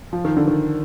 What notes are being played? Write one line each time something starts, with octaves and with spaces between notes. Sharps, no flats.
F3
D#3
D3
D#3